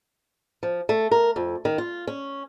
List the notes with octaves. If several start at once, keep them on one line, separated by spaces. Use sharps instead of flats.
F3
A3
A#4
F2
D#3
F4
C#4